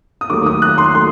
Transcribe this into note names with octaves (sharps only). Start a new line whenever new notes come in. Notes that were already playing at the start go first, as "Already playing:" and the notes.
D#6
D#2 D#3 F#3 A3 D6
D#6
F#6
C6
F#3 A3 C6